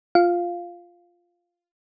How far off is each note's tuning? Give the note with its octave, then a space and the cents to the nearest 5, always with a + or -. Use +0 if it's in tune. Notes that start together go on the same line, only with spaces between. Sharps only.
F4 +0 F5 +0